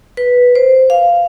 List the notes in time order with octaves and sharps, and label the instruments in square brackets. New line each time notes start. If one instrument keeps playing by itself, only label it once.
[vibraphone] B4
C5
F5